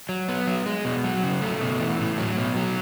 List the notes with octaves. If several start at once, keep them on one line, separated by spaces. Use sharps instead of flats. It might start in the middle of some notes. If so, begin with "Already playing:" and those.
F#3
B3
F#3
G#3
B2
F#3
C#3
A3
B2
E3
A2
F#3
B2
F#3